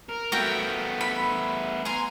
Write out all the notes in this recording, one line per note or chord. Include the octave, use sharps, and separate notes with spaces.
A#4
A3 B3 F#4 A#4 G5
B5
G#5 A#5 C6